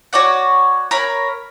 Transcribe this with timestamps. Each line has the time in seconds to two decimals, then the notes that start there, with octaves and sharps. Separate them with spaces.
0.13 F#4 C#5 D5 F#5
0.91 A#4 C#5 B5